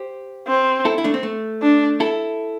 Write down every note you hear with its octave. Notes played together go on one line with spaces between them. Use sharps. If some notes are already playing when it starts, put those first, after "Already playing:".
Already playing: G4 C5
C4
E4 A4
E4
A3 D4
C4
A3
D4
E4 A4